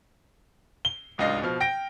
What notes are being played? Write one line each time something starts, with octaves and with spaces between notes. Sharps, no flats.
G7
D1 C#2 D4 D#5 F5
B2 F3 F6
G5 A#6 D7